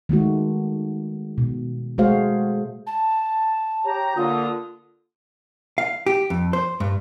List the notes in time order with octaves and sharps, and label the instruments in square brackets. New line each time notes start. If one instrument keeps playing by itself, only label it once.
[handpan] D#3 G#3 A3 F#4
B2
G#3 A3 F#4 G#4 C5 F5
[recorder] A5
[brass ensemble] G4 C#5 A#5
[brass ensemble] D3 A#3 F4 [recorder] D#6
[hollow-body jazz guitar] F5
G4
F2
C5
G2